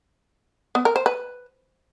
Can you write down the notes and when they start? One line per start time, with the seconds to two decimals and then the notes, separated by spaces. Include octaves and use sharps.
0.75 B3
0.85 A#4
0.96 C5
1.06 B4